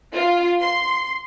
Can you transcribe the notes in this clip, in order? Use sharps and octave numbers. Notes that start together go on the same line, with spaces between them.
F4
C6